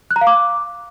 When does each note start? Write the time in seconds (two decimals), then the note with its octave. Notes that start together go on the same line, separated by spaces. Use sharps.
0.11 F#6
0.16 A#5
0.21 F5
0.27 D6